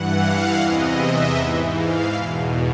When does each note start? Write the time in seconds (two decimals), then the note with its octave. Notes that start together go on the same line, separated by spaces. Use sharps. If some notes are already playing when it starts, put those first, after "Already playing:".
Already playing: G2 E3 F#5
0.21 F5
0.59 E2 C3 E3 D#5
0.98 E5
1.36 G#2 E3
1.76 F5
2.14 E2 B2